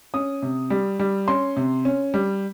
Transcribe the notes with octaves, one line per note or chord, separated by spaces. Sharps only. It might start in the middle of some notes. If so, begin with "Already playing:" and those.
C#4 D#6
C3
G3
G3
C#4 C6
C3
C#4
G3